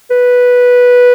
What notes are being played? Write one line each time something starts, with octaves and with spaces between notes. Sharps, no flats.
B4